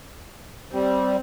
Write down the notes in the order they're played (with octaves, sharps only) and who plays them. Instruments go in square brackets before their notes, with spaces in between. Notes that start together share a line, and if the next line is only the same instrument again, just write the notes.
[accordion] G3 [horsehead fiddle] C4